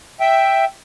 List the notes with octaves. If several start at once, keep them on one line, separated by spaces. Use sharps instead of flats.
E5 G5